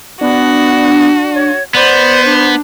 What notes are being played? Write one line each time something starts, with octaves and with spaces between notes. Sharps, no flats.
B3 D4 F#4
C#5
B3 C5 D5 B5
D4